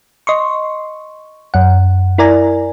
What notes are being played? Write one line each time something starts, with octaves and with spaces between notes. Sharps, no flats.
D#5 C6 C#6
F#2 F#5
E4 A#4 D5 G#5 A#5